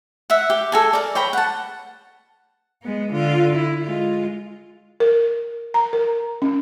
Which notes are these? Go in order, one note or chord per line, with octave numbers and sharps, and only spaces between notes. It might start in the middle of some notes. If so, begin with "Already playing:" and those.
E5 F#5
G4
A4 G#5 A#5
A#4 D5
C#5 G5 A#5 B5
F#5 A5
G#3 B3
D3 F4
E4
G#3 F4
A#4
A#5
A#4
C#4